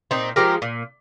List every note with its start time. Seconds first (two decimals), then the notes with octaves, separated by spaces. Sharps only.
0.11 A#2 C4 D#4
0.36 F3 G#3 G4 A#4
0.62 A#2